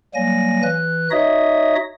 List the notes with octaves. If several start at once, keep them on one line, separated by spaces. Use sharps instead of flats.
F#3 G3 A#3 G#5 A#6
E3 F#6
D#4 F#4 C#5 D#5 E5 D#6